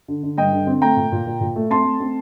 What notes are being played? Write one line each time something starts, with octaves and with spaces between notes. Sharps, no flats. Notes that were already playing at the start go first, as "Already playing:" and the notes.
D3
D3
G2 D#5 G5
D3
C4
A3 G5 A#5
A#2
A#2
A#2
A#2
A3
C4 A5 C6
A3
C4